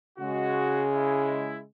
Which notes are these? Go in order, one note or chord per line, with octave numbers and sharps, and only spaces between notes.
C#3 G#3 F#4
E4